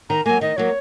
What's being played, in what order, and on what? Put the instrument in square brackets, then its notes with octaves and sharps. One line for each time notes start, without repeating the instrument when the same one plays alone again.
[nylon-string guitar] D#3 [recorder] A#5
[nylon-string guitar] F#3 A#3 [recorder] G#5
[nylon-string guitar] D#3 [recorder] D#5
[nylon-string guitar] F#3 A#3 [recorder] C#5